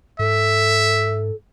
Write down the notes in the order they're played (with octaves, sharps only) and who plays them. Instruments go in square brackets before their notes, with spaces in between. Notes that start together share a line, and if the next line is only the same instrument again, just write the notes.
[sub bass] G#2 [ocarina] A4 [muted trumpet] E5